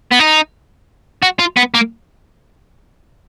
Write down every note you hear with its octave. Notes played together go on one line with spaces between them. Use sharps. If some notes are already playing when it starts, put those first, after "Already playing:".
B3
D#4
F#4
F4
B3
A#3